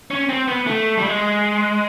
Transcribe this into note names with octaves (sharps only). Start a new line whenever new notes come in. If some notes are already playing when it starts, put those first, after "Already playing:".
C#4
C4
B3
A3
G3
G#3